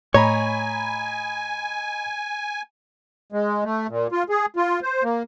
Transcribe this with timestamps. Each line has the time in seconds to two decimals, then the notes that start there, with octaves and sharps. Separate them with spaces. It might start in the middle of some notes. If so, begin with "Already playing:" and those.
0.14 A2 C#5 D#5 G#5 A#5 B5
3.32 G#3
3.64 A3
3.89 A#2
4.12 F4
4.29 G#4
4.56 F4
4.82 C5
5.03 A#3